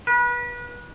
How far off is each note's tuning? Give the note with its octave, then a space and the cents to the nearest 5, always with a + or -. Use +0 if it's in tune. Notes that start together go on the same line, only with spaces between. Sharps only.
B4 -30